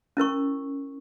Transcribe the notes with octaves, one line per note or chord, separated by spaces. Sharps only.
C#4 E4 A#4 C#6